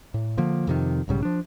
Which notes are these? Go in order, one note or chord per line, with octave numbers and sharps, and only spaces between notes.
A2
D3 F3 A#3
F2 C3 D#3
B1 G#2 C#3 G3
F3 D4